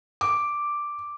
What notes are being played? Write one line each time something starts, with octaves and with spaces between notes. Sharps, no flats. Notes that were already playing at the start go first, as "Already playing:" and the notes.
D6